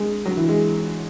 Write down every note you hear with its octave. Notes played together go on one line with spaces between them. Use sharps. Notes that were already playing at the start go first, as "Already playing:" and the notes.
Already playing: G#3
F#3
E3
G#3